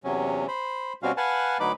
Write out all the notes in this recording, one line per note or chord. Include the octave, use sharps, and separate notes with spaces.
E2 C3 F#3 C#4
C5 B5
B2 G3 C4 C#4 F#4 F5
B4 F5 F#5 G#5 A5
D2 F#3 D#4 B4 B5 D6